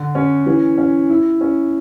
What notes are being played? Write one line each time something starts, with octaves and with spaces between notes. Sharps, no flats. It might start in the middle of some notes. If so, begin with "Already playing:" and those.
Already playing: D3
C#4
E3
C#4
E4
C#4